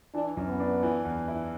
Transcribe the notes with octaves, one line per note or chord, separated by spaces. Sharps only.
E3 D4
F#2
B3
D4
E3
E2
E4